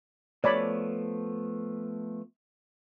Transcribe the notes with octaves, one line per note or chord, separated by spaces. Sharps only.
F3 A3 B3 C#5 D5 B5